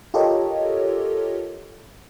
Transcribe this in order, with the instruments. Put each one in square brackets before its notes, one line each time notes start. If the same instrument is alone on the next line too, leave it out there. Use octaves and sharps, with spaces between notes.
[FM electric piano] F4 G4 A4 A#4 C#5 D#5